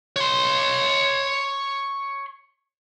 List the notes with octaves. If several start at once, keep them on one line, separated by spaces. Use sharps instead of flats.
C#5 C6